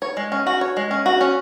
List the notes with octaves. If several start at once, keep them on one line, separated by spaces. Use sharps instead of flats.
C#5
G#3
C#4
F#4
C#5
G#3
C#4
F#4
C#4